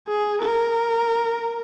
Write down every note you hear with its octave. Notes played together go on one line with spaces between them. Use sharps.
G#4
A#4